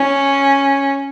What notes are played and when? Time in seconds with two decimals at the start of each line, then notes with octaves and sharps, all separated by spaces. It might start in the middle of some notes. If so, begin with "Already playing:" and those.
Already playing: C#4